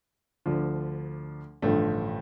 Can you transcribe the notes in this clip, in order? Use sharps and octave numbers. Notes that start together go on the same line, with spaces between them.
D2 D3 F3
A1 G2 D3 F3 A3